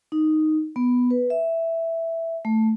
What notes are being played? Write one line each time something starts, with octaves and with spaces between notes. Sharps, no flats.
D#4
B3
B4
E5
A3